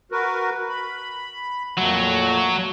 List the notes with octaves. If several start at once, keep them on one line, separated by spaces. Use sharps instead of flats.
F#4 A#4 B4
B5
F2 A#2 F#3 A3